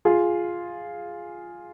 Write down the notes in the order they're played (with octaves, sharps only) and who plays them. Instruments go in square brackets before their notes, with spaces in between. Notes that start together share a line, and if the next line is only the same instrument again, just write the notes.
[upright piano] F4 G#4